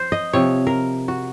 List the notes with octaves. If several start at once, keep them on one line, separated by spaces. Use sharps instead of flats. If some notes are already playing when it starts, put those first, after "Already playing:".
Already playing: C5
D#5
C3 F3 C#5
A#4
F#4